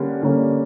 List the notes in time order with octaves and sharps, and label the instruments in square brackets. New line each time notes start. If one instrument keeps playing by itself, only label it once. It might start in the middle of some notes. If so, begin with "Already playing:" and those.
Already playing: [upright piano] D3 G3 A#3 C#4
D3 G3 A#3 C#4